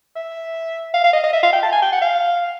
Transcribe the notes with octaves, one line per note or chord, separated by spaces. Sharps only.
E5
F5
F5
D#5
D#5
E5
F5
G5
A5
G#5
G5
F#5
F5